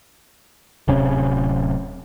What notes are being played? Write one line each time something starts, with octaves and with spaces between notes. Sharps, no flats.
D1 C3 C#4